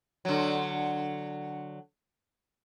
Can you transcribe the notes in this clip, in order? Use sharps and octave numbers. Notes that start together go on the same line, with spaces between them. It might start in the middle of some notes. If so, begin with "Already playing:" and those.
D3 F#3